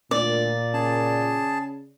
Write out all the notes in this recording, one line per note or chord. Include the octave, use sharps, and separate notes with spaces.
D2 A#2 D5
C#3 G#4 A5